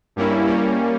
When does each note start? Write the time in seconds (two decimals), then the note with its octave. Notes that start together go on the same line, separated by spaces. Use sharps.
0.16 G2 G3 A#3 C#4 E4
0.47 G3 A#3 C#4